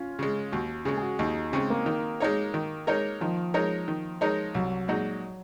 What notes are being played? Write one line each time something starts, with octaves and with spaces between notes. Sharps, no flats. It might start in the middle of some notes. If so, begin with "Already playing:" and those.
Already playing: C#4 F4
C#3 G#3
D#2 F#4
C#3 G#3 G#4
G#4
F#4
D#2 D#4
C#3 G#3 C4
A#3
D#3
G#3 D#4 A#4 C#5
D#3
G#3 D#4 A#4 C#5
D#3 F3
G#3 D#4 A#4 C#5
D#3
G#3 D#4 A#4 C#5
C2 F#3
A#2 G#3 D#4 F#4